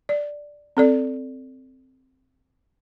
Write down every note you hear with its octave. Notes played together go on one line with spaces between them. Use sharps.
D5
C4 A4 D5